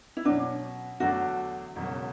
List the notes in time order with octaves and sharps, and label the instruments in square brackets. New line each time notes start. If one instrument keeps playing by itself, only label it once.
[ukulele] E4
[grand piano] B2 F#3 C#4 [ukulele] D4
[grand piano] E2 D3 F#3 A3 D4 [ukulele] F#4
[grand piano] E1 E2 C#3 F#3